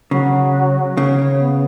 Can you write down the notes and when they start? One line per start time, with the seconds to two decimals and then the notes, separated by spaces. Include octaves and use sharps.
0.11 C#3 F#3
0.97 C#3 C#5
1.39 B3